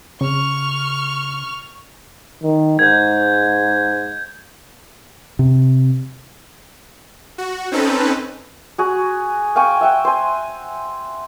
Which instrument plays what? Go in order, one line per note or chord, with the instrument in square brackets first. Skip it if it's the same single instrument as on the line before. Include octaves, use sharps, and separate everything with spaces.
[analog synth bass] C#3 [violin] C#6 F6
[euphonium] D#3
[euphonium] G#2 [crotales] G6 G#6
[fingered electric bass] C3
[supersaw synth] F#4
C4 C#4 D#4 A4 B4
[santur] F#4 G#4
F5 G5 G#5 C#6
E5 F#5 G5
C5 G#5